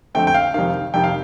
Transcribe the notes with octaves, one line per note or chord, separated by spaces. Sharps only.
F2 D3 A3 C4 G5
G5
F5
F2 C3 D#3 F5
F2 C3 D#3 G5
F5